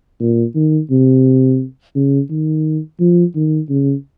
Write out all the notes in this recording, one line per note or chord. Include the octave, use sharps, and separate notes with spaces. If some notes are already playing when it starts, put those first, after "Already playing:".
A#2
D#3
C3
C#3
D#3
F3
D#3
C#3